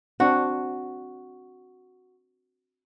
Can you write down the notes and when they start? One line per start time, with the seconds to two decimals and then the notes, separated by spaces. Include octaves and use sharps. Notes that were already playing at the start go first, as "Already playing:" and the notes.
0.20 C4 D4 F#4 F#5